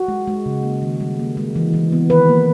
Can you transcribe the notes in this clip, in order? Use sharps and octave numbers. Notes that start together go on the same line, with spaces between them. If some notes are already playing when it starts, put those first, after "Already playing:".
Already playing: F#4
G#3
G#3
C#3
A#3
D#3
G3
A#3
G#3
E3
E3
B3
D#3 B4
A#3